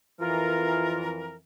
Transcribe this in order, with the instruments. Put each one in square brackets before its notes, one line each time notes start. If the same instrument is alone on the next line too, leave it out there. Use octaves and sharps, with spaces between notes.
[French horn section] F2 E3 [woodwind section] F4 A#4